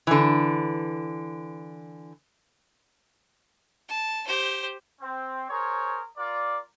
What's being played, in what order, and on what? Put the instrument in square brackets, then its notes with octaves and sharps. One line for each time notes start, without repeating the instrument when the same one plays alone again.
[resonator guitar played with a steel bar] D3 E3
[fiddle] A5
G4 C5
[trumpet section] C4
G#4 A#4 C5 C#5
F4 A#4 D5